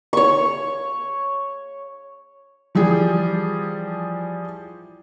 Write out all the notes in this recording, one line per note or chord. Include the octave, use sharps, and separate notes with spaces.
C#5 C#6
E3 F3 G3 G#4